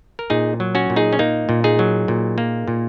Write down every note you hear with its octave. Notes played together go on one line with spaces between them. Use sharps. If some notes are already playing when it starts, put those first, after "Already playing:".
A#4
A#2 D#4 G#4
F#3
C#4 F#4
A#2
D#4 G#4
C#4
A#3 D#4
A#2
D#4 G#4
F#3
A#2
A#3
A#2